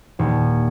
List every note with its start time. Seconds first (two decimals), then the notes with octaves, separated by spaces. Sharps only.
0.19 D#1